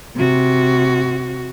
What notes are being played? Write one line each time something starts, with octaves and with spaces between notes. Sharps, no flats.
C3 F#4